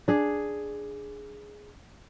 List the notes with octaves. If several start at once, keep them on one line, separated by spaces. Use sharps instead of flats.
D4 G#4